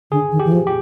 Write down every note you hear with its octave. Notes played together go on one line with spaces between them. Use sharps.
D3 G#4
D#3
G4
E3
F3
G4